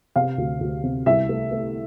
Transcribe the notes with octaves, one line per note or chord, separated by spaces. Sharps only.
C3 F5
D2
D2
C3
C2 E5
A3
A3